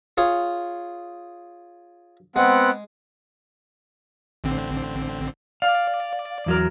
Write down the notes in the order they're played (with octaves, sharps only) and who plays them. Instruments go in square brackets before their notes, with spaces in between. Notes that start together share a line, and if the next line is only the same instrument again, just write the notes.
[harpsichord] F4 G#4 C#5
[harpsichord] G#3 [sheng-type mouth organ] B3 C4 F#5
[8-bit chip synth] A1 D3 C4
[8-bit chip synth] D5 [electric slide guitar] F5
[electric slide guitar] E2 F#3 A#4